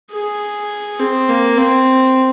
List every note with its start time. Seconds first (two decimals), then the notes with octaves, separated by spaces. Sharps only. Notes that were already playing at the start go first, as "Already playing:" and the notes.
0.12 G#4
0.99 C4
1.29 A#3
1.58 C4